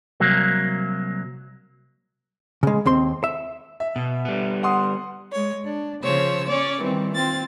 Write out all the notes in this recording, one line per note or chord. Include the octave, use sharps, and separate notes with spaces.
C2 F#3 A#3
C#3 G#3
D#2 C4 C6
E5
E5
B2
G3 B3
F#5 C6 D#6
G#3 C#5
D4
C#3 F3 C5 C#5 E6
C#4 C#5 D5
D#3 E3 G3 C4
C4 F4 A6